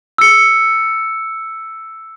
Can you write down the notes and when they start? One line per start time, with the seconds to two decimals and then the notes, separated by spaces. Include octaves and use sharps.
0.18 E6 C#7